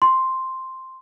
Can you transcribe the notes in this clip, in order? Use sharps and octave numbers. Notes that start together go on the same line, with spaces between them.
C6